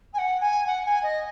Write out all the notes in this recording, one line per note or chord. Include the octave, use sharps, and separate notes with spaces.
G#5
F#5
G#5
F#5
G#5
D#5